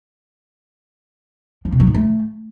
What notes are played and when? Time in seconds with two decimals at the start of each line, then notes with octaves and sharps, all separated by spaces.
1.65 F3
1.72 C3
1.80 F#3
1.87 G#2
1.94 A3